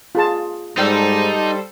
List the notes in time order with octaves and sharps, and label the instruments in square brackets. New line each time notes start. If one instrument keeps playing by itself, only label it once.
[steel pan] F4 G#4 A5
[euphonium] G#2 [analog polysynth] G3 A4 C5 [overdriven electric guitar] D#4